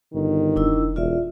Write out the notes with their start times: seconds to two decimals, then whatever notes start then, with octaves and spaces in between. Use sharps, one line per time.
0.14 G1 D#3
0.56 F1 D4 E4 E6
0.96 E1 F4 D5 E5